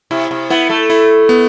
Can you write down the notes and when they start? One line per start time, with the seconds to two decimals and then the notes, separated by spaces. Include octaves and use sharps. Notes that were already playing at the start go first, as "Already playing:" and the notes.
0.11 C3 E4
0.31 C3
0.50 B3 E4
0.70 A3
0.90 E4
1.29 B3